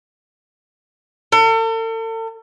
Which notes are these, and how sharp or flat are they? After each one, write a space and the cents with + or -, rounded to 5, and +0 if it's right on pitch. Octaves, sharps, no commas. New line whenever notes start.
A4 +40